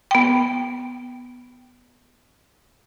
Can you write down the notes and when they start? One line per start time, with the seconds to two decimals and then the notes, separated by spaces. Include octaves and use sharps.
0.11 B3 G5